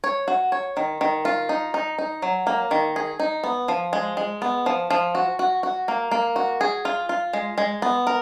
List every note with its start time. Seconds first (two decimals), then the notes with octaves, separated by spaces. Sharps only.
0.04 C#5
0.28 F#4
0.52 C#5
0.77 D#3
1.01 D#3
1.25 F4
1.49 D#4
1.74 D#4
1.98 D#4
2.22 F#3
2.47 A#3
2.71 D#3
2.96 G#4
3.20 D#4
3.44 B3
3.68 F3
3.93 G#3
4.17 G#3
4.42 B3
4.66 F3
4.90 F3
5.15 F#4
5.39 F#4
5.63 F#4
5.88 A#3
6.11 A#3
6.36 F#4
6.61 G#4
6.85 F4
7.09 F4
7.33 G#3
7.58 G#3
7.82 B3
8.07 A#4